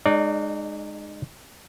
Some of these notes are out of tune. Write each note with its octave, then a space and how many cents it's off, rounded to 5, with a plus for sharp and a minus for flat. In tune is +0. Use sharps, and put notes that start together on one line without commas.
G#3 +0 D#4 -35 D5 -25